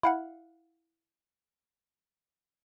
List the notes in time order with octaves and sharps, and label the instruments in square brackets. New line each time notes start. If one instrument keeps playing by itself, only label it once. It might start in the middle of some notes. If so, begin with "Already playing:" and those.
[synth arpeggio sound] E4 F5 F#5